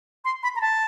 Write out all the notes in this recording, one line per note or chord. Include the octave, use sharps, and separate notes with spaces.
C6
B5
A#5
A5